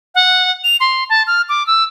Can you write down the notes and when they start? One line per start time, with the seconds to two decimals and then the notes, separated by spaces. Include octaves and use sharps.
0.15 F#5
0.64 F7
0.80 C6
1.10 A5
1.27 F6
1.49 D6
1.67 E6